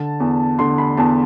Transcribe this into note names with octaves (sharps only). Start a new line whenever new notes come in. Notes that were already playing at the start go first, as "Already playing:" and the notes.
Already playing: D3 A5
E2
D3 C6
B5
E2 A5